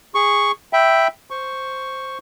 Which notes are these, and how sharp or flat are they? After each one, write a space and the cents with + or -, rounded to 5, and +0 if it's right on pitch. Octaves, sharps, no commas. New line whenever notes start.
G#4 -15 C#6 +0
E5 +0 G5 +0 B5 +0
C5 +0 C#6 +0